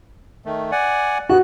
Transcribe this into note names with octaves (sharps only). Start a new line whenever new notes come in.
D#3 A3
D5 F#5 G#5
B3 F#4 F#6